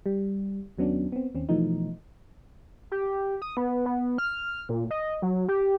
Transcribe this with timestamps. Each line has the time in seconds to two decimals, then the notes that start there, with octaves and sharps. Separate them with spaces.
0.06 G3
0.78 D#2 F#3 B3 C#4 D4
1.12 B3 C4
1.35 D#2 C4 C#4
1.49 B2 E3 F3 A3 D#4
2.91 G4
3.42 D#6
3.57 B3
3.86 B3
4.18 F6
4.69 A#2
4.91 D#5
5.22 F#3
5.48 G4